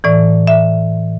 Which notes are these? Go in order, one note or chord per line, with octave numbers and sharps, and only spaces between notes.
A2 E3 D5
E5